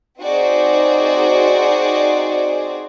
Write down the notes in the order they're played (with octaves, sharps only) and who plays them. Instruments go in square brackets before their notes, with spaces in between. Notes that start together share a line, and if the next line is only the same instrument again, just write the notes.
[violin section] C4 D#4 F#4 G#4 C5 D5